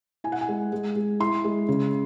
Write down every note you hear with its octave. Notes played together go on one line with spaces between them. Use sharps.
E4 G#5
F#5
G#5
G#3
G#3
G#3
E4 C6
G#3
C#3